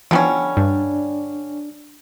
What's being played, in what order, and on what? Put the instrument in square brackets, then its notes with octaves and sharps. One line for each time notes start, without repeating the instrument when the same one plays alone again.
[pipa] D3 G3 C#4 [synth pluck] E3 F3 B3
[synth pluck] G2 [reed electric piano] D4